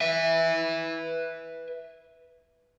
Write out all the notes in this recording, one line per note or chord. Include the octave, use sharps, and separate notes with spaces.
B4 E5